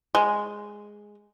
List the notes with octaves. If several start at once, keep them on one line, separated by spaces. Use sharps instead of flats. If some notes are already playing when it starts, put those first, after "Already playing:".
G#3